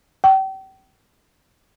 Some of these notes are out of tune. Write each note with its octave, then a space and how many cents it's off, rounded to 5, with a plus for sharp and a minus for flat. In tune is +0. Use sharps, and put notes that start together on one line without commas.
G5 -35